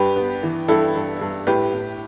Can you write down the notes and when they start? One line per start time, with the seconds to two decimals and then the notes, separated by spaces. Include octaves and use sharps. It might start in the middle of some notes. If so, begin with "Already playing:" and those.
Already playing: G2 G4 B4
0.16 B3
0.43 E3
0.68 G2 E4 A4
0.95 G2
1.21 G2
1.47 A2 G4 B4
1.74 A2